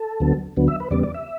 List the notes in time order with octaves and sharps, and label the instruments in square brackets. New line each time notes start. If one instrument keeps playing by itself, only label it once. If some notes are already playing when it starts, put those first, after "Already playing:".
Already playing: [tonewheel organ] A4
D2 D3 F#3 B3
D2 D3 F#3 B3
E5
B4
E2 C#3 G3 B3 D5
D5
E5